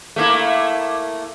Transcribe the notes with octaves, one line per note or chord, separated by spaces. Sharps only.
A3 A#3 E4